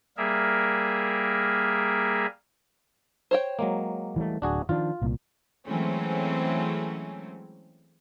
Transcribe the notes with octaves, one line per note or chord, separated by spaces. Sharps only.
G3 A#3 G#4 A#4 E5
C5 C#5 G5
F#3 G#3 A#3
E3 G3 A3
D1 D4 F#4 G#4
D#3 F3 D4 F4
C2 A#2
E3 F#3 G#3 A3 C4 C#4